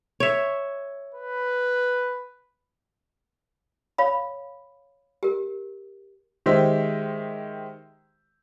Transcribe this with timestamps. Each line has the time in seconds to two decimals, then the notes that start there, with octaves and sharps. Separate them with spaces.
0.20 C#5 E5
1.15 B4
3.98 C#5 F5 B5
5.23 G4 A#4
6.46 D#3 G#3 G4 C5 E5